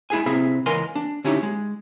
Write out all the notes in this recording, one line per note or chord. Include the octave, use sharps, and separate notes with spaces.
G#3 E4 G#4 G#5
C3 C4 E4 G#4 E5 A#5
C#2 E3 A#4 D#5 G#5 C6
D4
D3 C#4 D#4 E4 F#4 G4
G#3